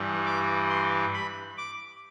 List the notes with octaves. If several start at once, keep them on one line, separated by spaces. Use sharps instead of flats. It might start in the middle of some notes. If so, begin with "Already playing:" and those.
Already playing: G2 E3 G3
D6
C6
B5
D6